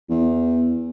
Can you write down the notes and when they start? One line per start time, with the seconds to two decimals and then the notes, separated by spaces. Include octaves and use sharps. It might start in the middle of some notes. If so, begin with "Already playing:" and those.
0.10 E2